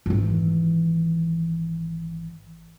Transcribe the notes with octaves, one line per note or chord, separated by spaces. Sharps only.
G#1 E3